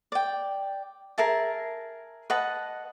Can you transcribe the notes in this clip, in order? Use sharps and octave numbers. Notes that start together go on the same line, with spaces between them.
D5 G5
G#4 A#4 E5 A5
B4 D#5 F#5 A5